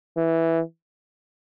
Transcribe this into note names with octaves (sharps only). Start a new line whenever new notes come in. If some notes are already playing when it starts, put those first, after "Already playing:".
E3